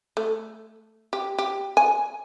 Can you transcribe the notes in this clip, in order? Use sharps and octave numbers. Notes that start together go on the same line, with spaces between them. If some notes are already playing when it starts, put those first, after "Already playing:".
A3
G4
G4
G#5